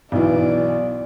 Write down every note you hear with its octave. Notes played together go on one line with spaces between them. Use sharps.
B1 E3 D5